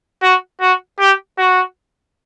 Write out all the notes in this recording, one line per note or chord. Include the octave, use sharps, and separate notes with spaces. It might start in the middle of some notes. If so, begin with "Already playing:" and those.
F#4
F#4
G4
F#4